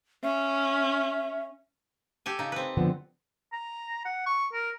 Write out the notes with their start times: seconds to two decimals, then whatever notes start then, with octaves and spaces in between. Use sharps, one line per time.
0.23 C#4 E5
2.26 G4 A4 G#5
2.39 C#3 D#4
2.52 C4 B4
2.77 D3 F3 B3
3.52 A#5
4.05 F#5
4.26 C#6
4.53 A#4